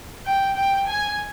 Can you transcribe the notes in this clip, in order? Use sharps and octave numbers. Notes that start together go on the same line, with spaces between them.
G5
G5
G#5